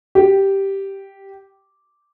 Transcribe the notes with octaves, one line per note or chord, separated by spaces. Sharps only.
G4